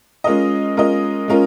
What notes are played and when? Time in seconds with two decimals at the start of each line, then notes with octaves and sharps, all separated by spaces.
0.24 G#3 C#4 F4 A#4 D#5
0.77 G#3 C#4 F4 A#4 D#5
1.28 G#3 C#4 F4 A#4